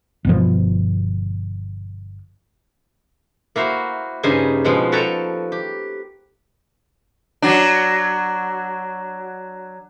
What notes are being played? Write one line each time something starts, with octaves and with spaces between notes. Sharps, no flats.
G1 B2 F3
A#3 E4 F#4 C5
G2 C#3 D#4 C5 G#5
B2 F3 G#3
A4 B4 C#5 G5 A5 A#5
G4
F#3 D4